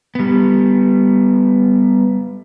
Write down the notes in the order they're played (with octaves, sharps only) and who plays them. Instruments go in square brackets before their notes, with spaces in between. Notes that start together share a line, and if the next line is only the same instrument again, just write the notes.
[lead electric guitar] G3 B3